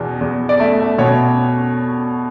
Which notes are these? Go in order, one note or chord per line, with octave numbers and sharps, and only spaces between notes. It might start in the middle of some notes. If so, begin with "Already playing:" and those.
Already playing: E2 B2
E2
D5
A3 E5
E5
B2 C#5